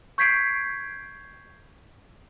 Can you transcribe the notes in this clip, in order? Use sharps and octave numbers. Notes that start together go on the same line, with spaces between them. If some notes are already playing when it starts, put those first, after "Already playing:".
C#6 G6 G#6 B6 C7 D7